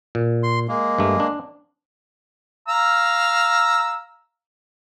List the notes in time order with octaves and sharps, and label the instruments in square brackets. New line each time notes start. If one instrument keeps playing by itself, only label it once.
[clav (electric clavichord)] A#2
[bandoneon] C6
G#3 A#3
[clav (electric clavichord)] G2 A3
D4
[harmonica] F5 A#5 E6